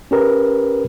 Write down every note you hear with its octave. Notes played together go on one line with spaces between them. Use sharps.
C#4 G4 A#4 B4